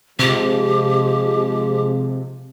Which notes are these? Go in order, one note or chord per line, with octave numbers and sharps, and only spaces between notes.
C3 F3 G#3 G4